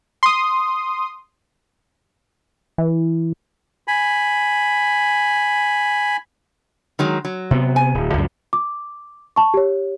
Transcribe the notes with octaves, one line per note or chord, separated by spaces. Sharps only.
C6 D#6
E3
G#5 B5
D#3 F#3 G#3
F#3
C3 B3
G#5
D1
C#2 F#2
D6
A5 C#6
G4 C#5